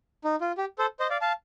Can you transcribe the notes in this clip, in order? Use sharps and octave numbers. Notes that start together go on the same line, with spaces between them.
D#4
F4
G4
A4 C5
C5 D#5
D5 F5
F5 A5